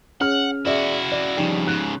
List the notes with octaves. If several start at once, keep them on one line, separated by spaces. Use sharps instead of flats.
C#4 G#4 F#5 F6
E4 F#4 G#4 D5 E5
D5
G2 C#3 F3 D#4 G4
G#2 C#3 F#6